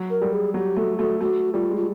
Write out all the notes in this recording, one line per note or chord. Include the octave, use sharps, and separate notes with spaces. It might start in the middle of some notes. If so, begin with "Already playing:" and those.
Already playing: F#3
A#4
G3
G#4
F#3 G4
A3 F#4
A3 F#4
A3 F#4
G3 F4
G#3
F4